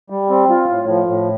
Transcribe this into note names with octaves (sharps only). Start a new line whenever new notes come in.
G3
C4
F4
A2
F3
A2